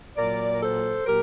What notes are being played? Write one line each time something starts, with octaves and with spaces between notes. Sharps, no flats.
A#2 F#3 A#4 D5
A#4
A4 C5
A#2 F#3 G4 A#4